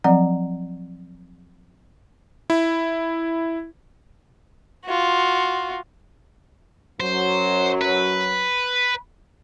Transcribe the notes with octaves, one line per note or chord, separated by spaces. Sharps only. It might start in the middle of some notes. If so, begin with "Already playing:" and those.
F3 F#3 C4 D5 F#5 A#5
E4
F4 F#4
F#2 F#3 C5
B4